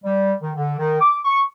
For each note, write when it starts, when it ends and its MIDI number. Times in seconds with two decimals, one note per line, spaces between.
0.04 0.33 55
0.41 0.50 51
0.56 0.74 50
0.79 0.96 51
1.00 1.17 86
1.25 1.41 85